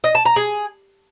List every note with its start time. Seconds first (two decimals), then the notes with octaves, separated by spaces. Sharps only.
0.04 D#5
0.15 A5
0.25 A#5
0.36 G#4